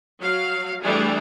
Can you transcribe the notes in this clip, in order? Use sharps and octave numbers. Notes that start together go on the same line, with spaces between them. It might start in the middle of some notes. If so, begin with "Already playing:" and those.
F#3 F5
E3 G3 A3 D4 G#4